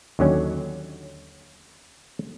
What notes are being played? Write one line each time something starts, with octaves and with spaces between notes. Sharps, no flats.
D#2 D3 F#3 C#4